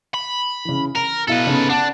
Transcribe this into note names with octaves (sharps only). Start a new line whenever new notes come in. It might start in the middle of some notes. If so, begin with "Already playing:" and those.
B5
C#3 E3
A#4 A#5
B2 E4 A4 B4 F5
C#3 B3 D#4
D4 F#5 A5 D7